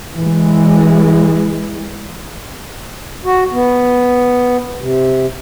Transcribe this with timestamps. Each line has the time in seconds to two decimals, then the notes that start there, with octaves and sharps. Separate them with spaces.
0.18 E3 G#3
3.24 F#4
3.52 B3
4.79 C3